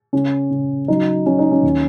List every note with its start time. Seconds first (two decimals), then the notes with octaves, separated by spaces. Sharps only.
0.13 C#3 C#4
0.51 C#3
0.88 F#3 D#4
1.26 F#3 C#4
1.39 D#4
1.51 C#4
1.63 D#2